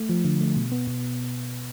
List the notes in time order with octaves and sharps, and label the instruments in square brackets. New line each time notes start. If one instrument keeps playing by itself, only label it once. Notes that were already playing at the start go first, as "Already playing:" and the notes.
Already playing: [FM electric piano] A3
F3
D3
A3
B2
B3
B2